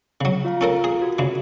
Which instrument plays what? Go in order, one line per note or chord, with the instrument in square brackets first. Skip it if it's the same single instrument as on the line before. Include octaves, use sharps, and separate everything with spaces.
[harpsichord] C#3 F#3
[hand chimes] F4 F5 A#5
[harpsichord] C#4 A4 A#4
G#4
[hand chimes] F#4
[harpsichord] D2 C#3